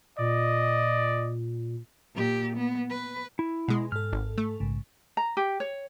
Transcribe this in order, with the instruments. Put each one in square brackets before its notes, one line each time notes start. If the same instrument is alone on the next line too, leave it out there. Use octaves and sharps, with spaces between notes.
[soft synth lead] A#2 [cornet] D5 [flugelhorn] D#5
[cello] A#2 G4
B3
B4
[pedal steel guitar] E4
[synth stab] B2 G#3
[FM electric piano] G#2 A4 [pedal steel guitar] F6
[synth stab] G#1
A3
[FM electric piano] A#1 G#2 C#3
[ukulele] A#5
G4
C#5